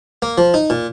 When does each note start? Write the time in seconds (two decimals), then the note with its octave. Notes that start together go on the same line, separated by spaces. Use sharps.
0.22 A#3
0.38 F3
0.54 D#4
0.70 A#2